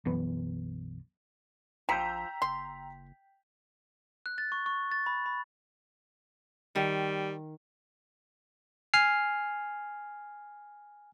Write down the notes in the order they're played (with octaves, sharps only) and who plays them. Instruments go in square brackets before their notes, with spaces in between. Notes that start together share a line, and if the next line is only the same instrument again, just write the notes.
[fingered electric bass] B1 F#2 E3 B3
[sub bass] A#1 [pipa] F3 [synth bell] G5 B6 [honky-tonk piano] A#5 E6 G6
[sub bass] F#1 [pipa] C6
[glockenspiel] F#6
A6
C#6
C#6
A6
B5
B5
[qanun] D#3 [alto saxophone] G3
[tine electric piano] G#5 F6 C7